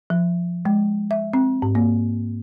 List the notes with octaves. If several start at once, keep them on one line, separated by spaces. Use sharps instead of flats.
F3
G#3
E5
C4
G#2
A#3